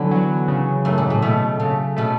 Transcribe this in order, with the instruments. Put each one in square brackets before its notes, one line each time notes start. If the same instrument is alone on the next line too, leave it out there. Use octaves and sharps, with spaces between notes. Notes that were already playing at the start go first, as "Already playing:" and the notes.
Already playing: [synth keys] D3 F#3 B3 [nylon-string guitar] E3
[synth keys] F#3
C#3
[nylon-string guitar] F#2 [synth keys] A3
[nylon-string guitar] G#2
A2
[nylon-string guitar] B2 [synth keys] A3
[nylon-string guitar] C#3 [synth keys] A3
[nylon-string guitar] B2 [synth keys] A3